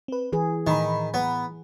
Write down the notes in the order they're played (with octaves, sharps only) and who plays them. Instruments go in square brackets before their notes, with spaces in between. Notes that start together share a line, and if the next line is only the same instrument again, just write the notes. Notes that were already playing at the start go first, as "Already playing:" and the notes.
[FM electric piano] C4 B4
[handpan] E3 G#4 [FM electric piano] B4
[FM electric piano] A2 A#5 B5 [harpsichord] D#3
[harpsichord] B3